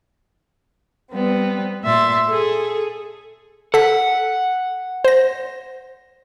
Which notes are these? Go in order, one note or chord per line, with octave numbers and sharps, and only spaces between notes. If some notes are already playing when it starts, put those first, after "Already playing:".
G3 B3 C4
A#2 E5 C6 A6
G#4 A4
A4 F#5 B6
C5 A#6